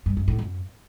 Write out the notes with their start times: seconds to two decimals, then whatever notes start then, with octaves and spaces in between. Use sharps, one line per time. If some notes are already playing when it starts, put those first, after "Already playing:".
0.06 G2
0.17 F#2
0.28 A2
0.39 F#2